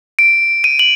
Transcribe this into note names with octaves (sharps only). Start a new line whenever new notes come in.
D7
D#7
F#7